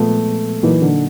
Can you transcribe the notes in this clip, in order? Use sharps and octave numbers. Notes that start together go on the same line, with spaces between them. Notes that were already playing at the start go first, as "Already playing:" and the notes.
Already playing: A#2 F3 G#3 A3 B3
A#2 E3 F#3 A#3 D#4
D3